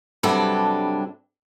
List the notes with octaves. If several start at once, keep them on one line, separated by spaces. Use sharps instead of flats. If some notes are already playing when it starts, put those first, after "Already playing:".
G2 C3 F#3 G3 D4 A4